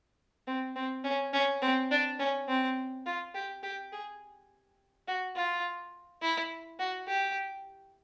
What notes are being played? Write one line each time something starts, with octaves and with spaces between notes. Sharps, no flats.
C4
C4
C#4
C#4
C4
D4
C#4
C4
F4
G4
G4
G#4
F#4
F4
E4
F#4
G4